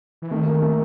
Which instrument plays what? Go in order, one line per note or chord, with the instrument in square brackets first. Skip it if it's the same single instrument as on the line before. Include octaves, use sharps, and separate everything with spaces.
[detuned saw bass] E3
[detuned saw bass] D#3 [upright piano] A3
[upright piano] A#3
A3